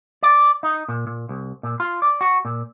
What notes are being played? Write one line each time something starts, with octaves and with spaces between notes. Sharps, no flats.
D5
D#4
A#2
A#2
C2
A#2
F4
D5
F#4
A#2